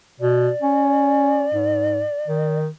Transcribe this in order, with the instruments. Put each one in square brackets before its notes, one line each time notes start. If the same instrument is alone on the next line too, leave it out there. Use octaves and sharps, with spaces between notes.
[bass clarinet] B2 [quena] D5
[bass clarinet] C#4
G#2
D#3